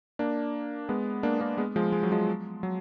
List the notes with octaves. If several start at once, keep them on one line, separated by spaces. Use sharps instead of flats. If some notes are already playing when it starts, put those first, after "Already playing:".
A#3 D4
G#3 B3
A#3 D4
A#3 D4
G#3 B3
F3 G#3
G#3
F#3
F3 G#3
F#3